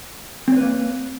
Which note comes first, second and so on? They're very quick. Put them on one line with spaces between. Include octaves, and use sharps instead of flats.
C4 C#5 B4 A#3